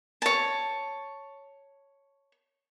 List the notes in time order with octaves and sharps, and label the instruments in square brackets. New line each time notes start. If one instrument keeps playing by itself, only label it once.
[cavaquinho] C#5 A5